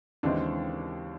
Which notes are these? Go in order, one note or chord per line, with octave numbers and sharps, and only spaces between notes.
D#2 C#3 E3 G#3 C4 D4